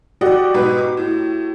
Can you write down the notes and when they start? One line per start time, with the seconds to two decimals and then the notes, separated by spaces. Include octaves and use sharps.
0.21 F#4 G4 D5 D#5 F#5
0.54 G#2 B2 B4
0.78 D6
0.97 A2